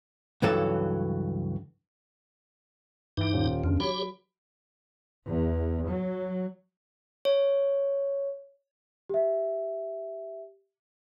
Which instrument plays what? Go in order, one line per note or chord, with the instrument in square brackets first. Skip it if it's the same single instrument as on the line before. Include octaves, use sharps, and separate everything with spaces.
[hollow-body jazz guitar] C#2 G2 E3 F#3 A4
[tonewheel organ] G2 D#4 [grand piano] E3 D7
[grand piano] D#1 F4 C5
[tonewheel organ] F2 [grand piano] C#3 B3 D4
[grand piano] F#3 B5 D7 [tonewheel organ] G4 C#5
[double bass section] E2
F#3
[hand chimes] C#5
[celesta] G4 E5